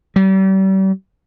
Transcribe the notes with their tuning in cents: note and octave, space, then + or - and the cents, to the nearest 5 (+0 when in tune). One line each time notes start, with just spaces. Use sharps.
G3 -40